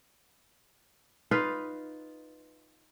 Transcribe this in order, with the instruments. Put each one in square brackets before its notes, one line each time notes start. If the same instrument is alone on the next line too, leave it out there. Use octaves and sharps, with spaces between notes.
[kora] D#4 F4 B4 F5